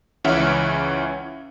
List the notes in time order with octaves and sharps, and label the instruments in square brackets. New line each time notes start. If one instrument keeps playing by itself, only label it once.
[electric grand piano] C#2 E3 C#4 E5 F#5 F6